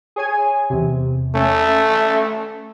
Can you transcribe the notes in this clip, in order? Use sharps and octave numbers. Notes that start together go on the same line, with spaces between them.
G#4 C#5 G#5
E2 C3
A3 C#4